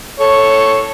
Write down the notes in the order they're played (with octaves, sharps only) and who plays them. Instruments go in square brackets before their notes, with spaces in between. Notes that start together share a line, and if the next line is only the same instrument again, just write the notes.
[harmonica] A4 C#5